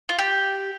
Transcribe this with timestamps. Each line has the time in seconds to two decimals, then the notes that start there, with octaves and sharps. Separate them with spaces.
0.09 F4
0.19 G4